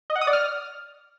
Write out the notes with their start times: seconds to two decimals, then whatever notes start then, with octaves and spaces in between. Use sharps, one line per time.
0.10 D#5
0.16 F#5
0.21 D#6
0.27 D5
0.33 F6